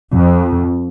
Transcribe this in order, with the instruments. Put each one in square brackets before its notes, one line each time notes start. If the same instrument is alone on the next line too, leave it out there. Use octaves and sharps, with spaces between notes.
[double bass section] F2